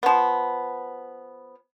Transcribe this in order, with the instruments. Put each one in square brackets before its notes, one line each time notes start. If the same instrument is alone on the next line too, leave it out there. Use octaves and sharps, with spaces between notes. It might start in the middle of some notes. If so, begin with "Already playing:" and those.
[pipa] F3 B3